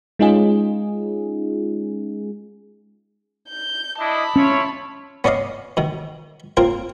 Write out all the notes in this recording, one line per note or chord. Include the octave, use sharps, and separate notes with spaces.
G#3 C#4 D#4 F4 G#4
G6
D4 E4 D#5 A5 B5
C#4 E4 F4 C#5
B3 C#4 D5 D#5 F5
B2 D#3
A#3 C4 F4 A#4